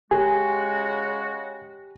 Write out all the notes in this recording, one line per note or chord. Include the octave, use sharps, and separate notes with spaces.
C#3 G#3 F#4 G4 G#5